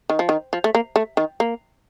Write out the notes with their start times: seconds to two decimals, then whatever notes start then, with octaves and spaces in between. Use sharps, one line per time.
0.10 D#3
0.19 F3
0.29 D#3
0.53 F3
0.64 A3
0.75 A#3
0.96 A3
1.17 D#3
1.40 A#3